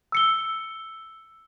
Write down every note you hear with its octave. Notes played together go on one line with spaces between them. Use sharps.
E6 C#7 G7